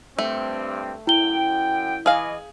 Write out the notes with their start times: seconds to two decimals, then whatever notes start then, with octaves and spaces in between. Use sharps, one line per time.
0.18 G2 A3 C4
1.07 F#2 E4 G5 G7
2.06 E3 G#4 D#5 F5